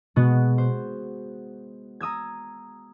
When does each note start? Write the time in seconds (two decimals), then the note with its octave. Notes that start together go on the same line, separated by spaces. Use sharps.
0.16 B2 G#3 B3 F#4
0.58 C5
2.00 A#5 D#6 E6 G#6